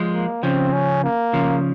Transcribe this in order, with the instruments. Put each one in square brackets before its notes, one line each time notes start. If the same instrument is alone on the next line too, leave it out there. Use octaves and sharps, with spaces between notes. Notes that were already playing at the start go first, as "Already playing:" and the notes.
Already playing: [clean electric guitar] F3 G#3
[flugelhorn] A#3
[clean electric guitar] C#3 F3 [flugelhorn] C4
[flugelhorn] C#4
A#3
[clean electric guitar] C#3 F3